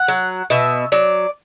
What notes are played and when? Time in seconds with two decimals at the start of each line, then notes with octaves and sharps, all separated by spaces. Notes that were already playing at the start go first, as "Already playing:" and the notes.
Already playing: F#5
0.08 F#3
0.50 B2 E5
0.92 F#3 D5